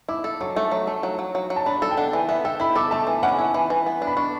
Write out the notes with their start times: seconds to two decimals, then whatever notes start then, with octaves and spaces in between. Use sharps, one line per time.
0.09 E4 D6
0.24 A4
0.41 F#3 C#6
0.56 A3
0.71 F#3
0.87 A3
1.03 F#3
1.19 F#3
1.35 F#3
1.50 F#3
1.56 A5
1.66 D4 B5
1.82 A4
1.91 G5
1.97 D4 F#5
2.13 E3
2.29 B3 E5
2.45 A4 G5
2.60 E4 B5
2.76 A4 D6
2.91 A3 A5
3.07 E3
3.23 C#4 F#5
3.38 E4
3.54 E3
3.70 E3
3.86 B3
4.02 D4
4.07 B5
4.17 D4 C#6